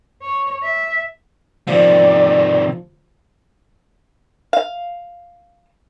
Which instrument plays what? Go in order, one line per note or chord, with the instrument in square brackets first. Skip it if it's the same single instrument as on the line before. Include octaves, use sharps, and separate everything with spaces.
[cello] C#5
E5
[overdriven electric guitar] C3 D#3 [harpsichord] F3 [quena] D5
[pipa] F5